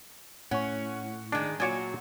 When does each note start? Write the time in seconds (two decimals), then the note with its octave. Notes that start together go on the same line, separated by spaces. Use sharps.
0.51 A2 C#4 F#5 C#6
1.32 D#3 G#3 D4
1.60 A#2 F#3 F#4 C#5 D5 G#5